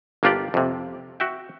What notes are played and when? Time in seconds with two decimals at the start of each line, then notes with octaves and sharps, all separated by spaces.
0.23 G1 A#3 D4 F4 G4 D5
0.54 F2 C3
1.20 F#4 E5 G5